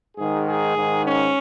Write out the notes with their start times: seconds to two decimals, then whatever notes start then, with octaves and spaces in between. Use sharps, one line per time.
0.17 G#2 D#3 G#4
0.46 G#4
0.76 G#2 D#3
1.05 C#4